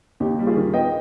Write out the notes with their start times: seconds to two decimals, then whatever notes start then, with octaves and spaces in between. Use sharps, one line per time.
0.20 D#2 D#4 G4
0.39 G3
0.47 F4 G#4
0.57 D#3
0.74 B3 D#5 G5